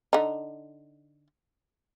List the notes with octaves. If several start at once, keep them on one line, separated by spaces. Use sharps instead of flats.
D3 D#4